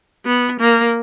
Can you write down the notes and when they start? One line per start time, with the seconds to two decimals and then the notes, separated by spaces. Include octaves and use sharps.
0.26 B3
0.60 A#3